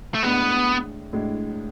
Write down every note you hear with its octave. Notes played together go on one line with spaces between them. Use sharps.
A3
A2 G#3 B3 D4
A2 G#3 D4